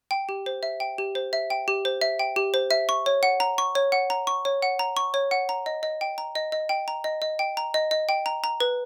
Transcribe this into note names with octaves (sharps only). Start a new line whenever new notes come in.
G5
G4
C5
E5
G5
G4
C5
E5
G5
G4
C5
E5
G5
G4
C5
E5
C#6
C#5
F#5
A#5
C#6
C#5
F#5
A#5
C#6
C#5
F#5
A#5
C#6
C#5
F#5
A#5
D#5
D#5
G5
A#5
D#5
D#5
G5
A#5
D#5
D#5
G5
A#5
D#5
D#5
G5
A#5
A#5
B4